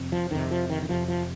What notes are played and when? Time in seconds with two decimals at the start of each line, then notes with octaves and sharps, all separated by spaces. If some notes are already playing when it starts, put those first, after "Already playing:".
Already playing: F2 C3
0.12 F3
0.31 F2 C3 D#3
0.51 F3
0.70 D#3
0.82 D#3
0.89 F2 C3 F3
1.08 F3